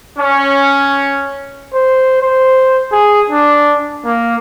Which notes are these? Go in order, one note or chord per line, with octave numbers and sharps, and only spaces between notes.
C#4
C5
C5
G#4
D4
A#3